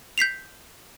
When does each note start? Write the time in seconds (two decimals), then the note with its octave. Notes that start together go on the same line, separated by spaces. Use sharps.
0.18 G6 B6 C7 F7